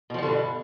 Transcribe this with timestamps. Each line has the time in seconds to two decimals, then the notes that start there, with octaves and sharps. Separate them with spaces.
0.10 B2
0.14 F3
0.18 G3
0.23 D3
0.27 G2